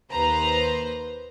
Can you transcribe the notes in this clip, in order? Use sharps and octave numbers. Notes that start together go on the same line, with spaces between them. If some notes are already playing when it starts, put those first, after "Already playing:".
D#2 B4 C5 A#5